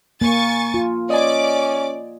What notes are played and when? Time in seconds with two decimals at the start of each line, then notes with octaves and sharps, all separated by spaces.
0.21 A#3 G#5 C#6 A6
0.74 F4
1.10 C#4 D5 D#5 G#5 D6